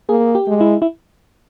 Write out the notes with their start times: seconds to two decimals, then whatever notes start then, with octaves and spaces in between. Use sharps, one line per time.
0.09 A#3 G#4
0.35 G4
0.47 G#3
0.61 E4
0.82 E4